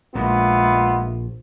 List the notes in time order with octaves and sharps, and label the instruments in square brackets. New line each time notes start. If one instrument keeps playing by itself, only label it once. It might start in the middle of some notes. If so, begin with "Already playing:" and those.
[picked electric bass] A#1 [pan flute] G#3 [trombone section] B3 E4 F4